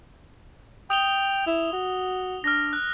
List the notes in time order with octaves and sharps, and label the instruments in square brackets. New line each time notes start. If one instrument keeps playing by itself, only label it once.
[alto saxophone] G5 [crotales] D#6 F7 G7
[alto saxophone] E4
F#4
[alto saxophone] D4 [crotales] F6 A#6
[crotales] F#6